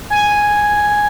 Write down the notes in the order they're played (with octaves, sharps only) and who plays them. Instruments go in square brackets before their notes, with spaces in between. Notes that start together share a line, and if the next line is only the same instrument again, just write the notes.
[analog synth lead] G#5